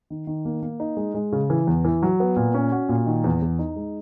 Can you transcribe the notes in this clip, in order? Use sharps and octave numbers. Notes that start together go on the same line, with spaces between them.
D#3
D#3
A#3
A#3
D#4
G#3
G#3
C#3
E3
E2
E3
F#3
B3
A#2
C#4
F#4
A#2
D#3
E2
E2
D#4
G#3